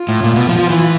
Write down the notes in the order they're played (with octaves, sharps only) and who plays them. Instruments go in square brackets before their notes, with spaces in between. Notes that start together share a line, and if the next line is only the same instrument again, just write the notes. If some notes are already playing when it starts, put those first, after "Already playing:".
Already playing: [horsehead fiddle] F4
[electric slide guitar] A2
A#2
B2
F3
F3
E3